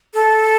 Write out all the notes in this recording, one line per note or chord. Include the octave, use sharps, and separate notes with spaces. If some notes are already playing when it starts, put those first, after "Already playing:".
A4